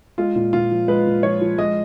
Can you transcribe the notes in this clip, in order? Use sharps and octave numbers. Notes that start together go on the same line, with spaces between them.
G#3 F4
A#2
A#2 F4
F3
G#3 B4
A#2
F3 C#5
F3
G#3 D#5